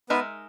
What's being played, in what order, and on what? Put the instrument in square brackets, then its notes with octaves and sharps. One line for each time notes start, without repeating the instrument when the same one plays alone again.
[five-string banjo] G#3 D#4 A#4 E5 [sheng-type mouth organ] B3 B4